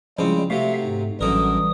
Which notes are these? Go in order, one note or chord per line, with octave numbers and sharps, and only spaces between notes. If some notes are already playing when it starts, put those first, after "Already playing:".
C#3 F3 G3 G#3 C4 E4
C3 F#3 A3 E5 F5
G#2
A1 F#2 D3 E3 G3 A#4 D#6